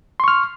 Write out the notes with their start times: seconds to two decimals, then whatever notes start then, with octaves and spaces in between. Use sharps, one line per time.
0.20 C6
0.24 C#6
0.28 F6